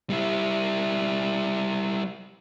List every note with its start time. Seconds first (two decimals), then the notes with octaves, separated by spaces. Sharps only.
0.10 G3 E4